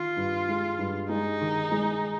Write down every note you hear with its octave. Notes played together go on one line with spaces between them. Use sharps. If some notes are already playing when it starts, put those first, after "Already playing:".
Already playing: D#3 F4
G2
G#3
G2
G#3 D#4
D#3
G#3